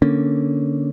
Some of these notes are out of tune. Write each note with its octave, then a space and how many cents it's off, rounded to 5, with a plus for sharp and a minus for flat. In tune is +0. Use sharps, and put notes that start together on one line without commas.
D3 +0 A#3 +0 C#4 +0